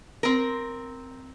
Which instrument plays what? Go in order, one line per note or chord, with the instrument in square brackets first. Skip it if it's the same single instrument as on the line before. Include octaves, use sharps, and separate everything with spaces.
[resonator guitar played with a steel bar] C4 A#4